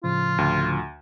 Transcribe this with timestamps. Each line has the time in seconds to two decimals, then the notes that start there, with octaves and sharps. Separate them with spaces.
0.04 A2 C#3 F3 F4
0.38 D2